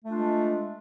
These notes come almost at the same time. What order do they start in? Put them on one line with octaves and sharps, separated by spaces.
A3 F4 D4 G#3